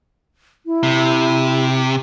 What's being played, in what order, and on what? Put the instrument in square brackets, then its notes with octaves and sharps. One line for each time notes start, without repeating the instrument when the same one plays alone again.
[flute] E4
[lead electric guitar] C3